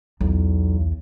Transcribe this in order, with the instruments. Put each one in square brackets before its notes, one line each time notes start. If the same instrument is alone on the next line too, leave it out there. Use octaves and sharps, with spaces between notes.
[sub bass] B1 [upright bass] E2